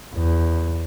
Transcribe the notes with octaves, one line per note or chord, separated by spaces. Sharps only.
E2